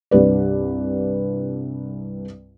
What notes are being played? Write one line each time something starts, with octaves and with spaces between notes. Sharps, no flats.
C2 G2 B4 D5